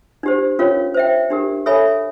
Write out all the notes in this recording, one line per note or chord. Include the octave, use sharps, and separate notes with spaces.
D4 G4 C5
C#4 F4 A#4 C#5 F5
C5 E5 G5
D4 G4 A#4
A4 C#5 E5 G#5 B5